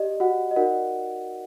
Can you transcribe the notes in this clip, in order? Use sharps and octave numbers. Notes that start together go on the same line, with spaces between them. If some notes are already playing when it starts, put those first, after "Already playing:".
Already playing: G4 D5 D#5
F#4 F#5
D#5
D#4 F#4 A#4 D5 F#5